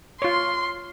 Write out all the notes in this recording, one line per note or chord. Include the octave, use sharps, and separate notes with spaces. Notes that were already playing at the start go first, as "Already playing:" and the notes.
F4 C#5 C6